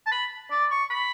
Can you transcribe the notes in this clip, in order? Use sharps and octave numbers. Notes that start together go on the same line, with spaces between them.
A5
B5
D5
C#6
B5